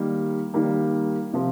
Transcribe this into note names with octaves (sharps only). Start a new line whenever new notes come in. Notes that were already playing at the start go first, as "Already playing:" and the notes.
Already playing: D#3 G3 A#3
D#3 G3 A#3
C3 F3